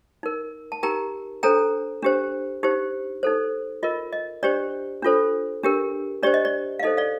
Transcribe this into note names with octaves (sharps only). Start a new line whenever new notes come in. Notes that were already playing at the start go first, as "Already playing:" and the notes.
D#4 A#4
A5
D#4 G4 A#4 G5 A#5
D4 A4 C5 G5 A#5
D4 G4 C5
D#4 G4 C5
D#4 A4 C5
F4 A#4 D#5
D#5
D4 G4 C5 D5
D4 F4 A4 C5
D4 G4 A#4
D4 G4 C5 D5
D#5
D5
F5
D#4 A4 C5 D#5
D5 F5